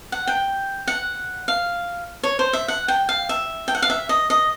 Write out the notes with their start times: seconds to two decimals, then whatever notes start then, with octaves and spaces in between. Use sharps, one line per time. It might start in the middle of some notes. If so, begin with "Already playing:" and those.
0.12 F#5
0.27 G5
0.88 F#5
1.48 F5
2.23 C#5
2.39 C5
2.53 E5
2.68 F#5
2.88 G5
3.09 F5
3.29 E5
3.68 G5
3.75 F#5
3.82 F5
3.90 E5
4.09 D#5
4.30 D#5